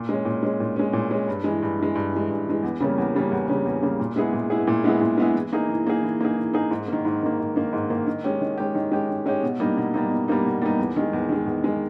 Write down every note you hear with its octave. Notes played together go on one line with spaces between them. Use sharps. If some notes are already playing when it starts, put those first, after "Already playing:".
Already playing: A#2
G#3 C#4
A#2
G#3 C#4
A#2
G#3 C#4
A#2
G#3 C#4
G2
E3 G#3
G2
E3 G#3
G2
E3 G#3
G2
E3 G#3
E2
C#3 G3 A#3 C#4
E2
C#3 G3 A#3 C#4
E2
C#3 G3 A#3 C#4
E2
C#3 G3 A#3 C#4
A#2
G#3 B3 E4 G#4
A#2
G#3 B3 E4 G#4
A#2
G#3 B3 E4 G#4
A#2
G#3 B3 E4 G#4
E3
A#3 D#4 G#4
E3
A#3 D#4 G#4
E3
A#3 D#4 G#4
E3
A#3 D#4 G#4
G#2
D#3 A#3
G#2
D#3 A#3
G#2
D#3 A#3
G#2
D#3 A#3
D#3
G#3 C#4 G4
D#3
G#3 C#4 G4
D#3
G#3 C#4 G4
D#3
G#3 C#4 G4
B2
G3 A#3 D#4
B2
G3 A#3 D#4
B2
G3 A#3 D#4
B2
G3 A#3 D#4
E2
D#3 G#3
E2
D#3 G#3
E2
D#3 G#3